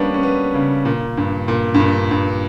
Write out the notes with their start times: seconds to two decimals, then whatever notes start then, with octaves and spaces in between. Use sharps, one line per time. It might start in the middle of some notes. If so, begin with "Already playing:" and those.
Already playing: G3 A#3 B3 C#4 D4
0.14 C#4
0.23 B3
0.54 C#3
0.85 A#2
1.17 G2
1.48 A#2
1.74 G2
1.80 A#2
2.11 G2